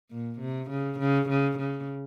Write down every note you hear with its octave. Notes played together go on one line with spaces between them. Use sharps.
A#2
C3
C#3
C#3
C#3
C#3